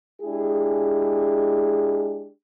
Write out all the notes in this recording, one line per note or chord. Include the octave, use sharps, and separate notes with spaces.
G#3 D4 E4 G4 G#4